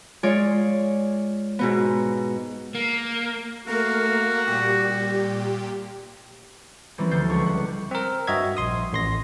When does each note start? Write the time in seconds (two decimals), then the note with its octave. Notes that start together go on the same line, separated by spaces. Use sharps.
0.23 G#3 F4 C#5 D5
1.59 G#2 B2 B3
2.75 A#3
3.67 A3 A#3 F#4 A#4 F5
4.47 A#2 G3 G4
6.98 E3 F3 G3 A#3 C4 C#4
7.11 D2 D3 A4 G6 C7
7.30 C#2 D4 F4 C#6
7.46 F#5
7.91 C4 A#4
8.27 G2 F#4 D#5 E5 G#6
8.57 A#1 C6 D#6
8.93 A1 C6 A#6